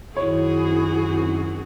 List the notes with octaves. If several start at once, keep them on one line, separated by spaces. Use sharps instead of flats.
F#2 D#3 C4 E4 F#4 G#4 C#5